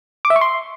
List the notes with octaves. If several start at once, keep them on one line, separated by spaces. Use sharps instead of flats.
D6
E5
C#6
C6